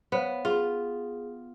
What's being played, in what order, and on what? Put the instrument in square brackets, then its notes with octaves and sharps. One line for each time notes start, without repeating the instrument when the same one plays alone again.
[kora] B3 [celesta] C5 C#5 F5
[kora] F4 [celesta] G#4